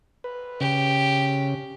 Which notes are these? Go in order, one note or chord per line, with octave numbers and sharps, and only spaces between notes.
B4
C#3 G4